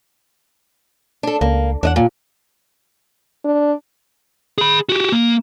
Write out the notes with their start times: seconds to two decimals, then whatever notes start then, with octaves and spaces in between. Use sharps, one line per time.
1.23 D4 A4
1.41 C#2 A#3
1.83 E2 D4 D#5 F#5
1.96 A#2
3.44 D4
4.58 G#4 B5
4.89 F#4 G4
5.12 A#3